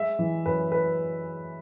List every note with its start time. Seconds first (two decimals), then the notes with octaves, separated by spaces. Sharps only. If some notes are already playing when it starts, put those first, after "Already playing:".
Already playing: G#3 E5
0.19 E3
0.46 F#2 B4
0.72 B4